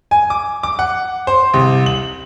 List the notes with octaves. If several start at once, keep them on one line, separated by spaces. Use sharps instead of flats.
G#5
D6
D6
F#5
C5
C2
F#7